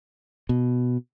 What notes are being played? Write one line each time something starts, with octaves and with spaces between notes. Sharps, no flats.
B2